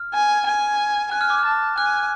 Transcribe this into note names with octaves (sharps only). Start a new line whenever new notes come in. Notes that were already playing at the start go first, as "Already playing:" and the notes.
Already playing: F6
G#5
G#5
G#5 F#6
F6
D6
F6
A5
G#5 F#6